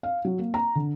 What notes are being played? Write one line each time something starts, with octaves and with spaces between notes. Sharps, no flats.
F5
F#3
A#3
A#5
D3